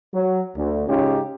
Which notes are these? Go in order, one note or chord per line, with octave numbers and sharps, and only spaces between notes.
F#3
D2
G#2 C#3 C#4 D#4 F4 G4